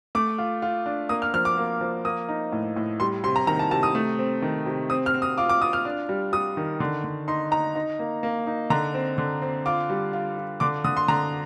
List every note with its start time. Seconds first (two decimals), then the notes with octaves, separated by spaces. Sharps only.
0.15 A3 D6
0.38 F4
0.62 F4
0.86 D4
1.09 A#3 D#6
1.22 F6
1.33 F3 F6
1.45 D6
1.58 A#3
1.81 F3
2.05 A#3 D#6
2.29 D#4
2.52 A2
2.76 A2
3.00 G3 C6
3.24 C3 C6
3.36 A#5
3.47 D#3 A#5
3.59 A5
3.71 C3 A5
3.83 D#6
3.95 A3
4.19 C4
4.42 D#3
4.66 C3
4.90 C4 D#6
5.06 F6
5.14 C4
5.22 D#6
5.38 F4 D6
5.49 D6
5.61 F4 D#6
5.73 F6
5.85 D4
6.09 G3
6.33 G3 D#6
6.57 D#3
6.80 D3
7.04 D3
7.28 D#4 C6
7.51 D#4 A#5
7.75 D#4
7.99 A#3
8.23 A#3
8.47 D#4
8.70 D3 A#5
8.94 C4
9.18 D3
9.42 C4
9.66 F4 D6
9.90 G3
10.13 F4
10.37 F4
10.60 D3 D6
10.84 D3 D#6
10.97 C6
11.08 D3 A#5